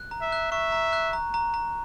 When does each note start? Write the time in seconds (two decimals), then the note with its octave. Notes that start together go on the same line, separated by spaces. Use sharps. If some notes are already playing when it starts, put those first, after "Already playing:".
Already playing: F#6
0.11 A#5
0.22 E5
0.32 F#6
0.52 E5 C#6
0.72 A#5
0.93 F#6
1.13 A#5
1.34 A#5
1.54 A#5